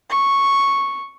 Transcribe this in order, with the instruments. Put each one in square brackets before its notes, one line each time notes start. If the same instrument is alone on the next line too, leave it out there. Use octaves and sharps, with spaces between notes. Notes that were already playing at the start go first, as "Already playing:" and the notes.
[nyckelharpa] C#6